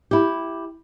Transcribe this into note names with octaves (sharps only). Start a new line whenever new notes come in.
E4 G4